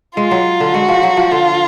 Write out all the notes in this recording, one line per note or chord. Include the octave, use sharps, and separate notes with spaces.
G#3 F4
F#3
D3
G#3 F#4
F3
F#3
F3
D3 F4